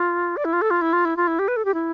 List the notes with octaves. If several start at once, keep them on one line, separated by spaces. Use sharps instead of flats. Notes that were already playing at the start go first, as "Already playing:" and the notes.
Already playing: F4
D5
E4
F4
A4
F4
E4
F4
E4
F4
E4
G4
B4
A4
G4
E4